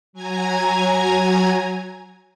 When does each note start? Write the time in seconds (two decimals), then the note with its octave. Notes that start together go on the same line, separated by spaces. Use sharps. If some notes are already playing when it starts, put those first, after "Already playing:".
0.13 F#3 G#5 A#5 G#6